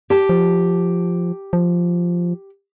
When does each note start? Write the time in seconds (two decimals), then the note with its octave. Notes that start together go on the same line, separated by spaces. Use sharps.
0.10 G4 A5
0.29 F3
1.53 F3